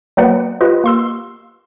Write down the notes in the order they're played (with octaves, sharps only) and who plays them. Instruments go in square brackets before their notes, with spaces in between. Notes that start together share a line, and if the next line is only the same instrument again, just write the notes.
[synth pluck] F#3 A#3 B3 B4 D5 F#5
F4 G4 B4 D#5
A#3 C6 E6